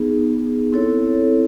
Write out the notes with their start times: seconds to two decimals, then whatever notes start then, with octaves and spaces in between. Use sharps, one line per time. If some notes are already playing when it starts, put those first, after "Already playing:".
Already playing: B3 D#4 G#4
0.72 C4 E4 A4 C#5